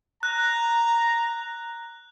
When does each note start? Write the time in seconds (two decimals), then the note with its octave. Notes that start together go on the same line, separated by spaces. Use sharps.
0.23 A#5 F#6